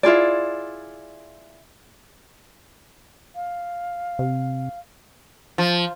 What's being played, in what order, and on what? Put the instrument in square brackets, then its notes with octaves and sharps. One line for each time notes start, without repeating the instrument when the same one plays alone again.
[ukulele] E4 F4 G#4 D5
[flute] F5
[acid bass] C3
[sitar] F3